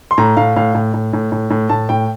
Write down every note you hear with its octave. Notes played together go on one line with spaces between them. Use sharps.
C6
A2 A#5
A2 F5
A2 F5
A2
A2
A2
A2
A2
A2 A5
A2 G5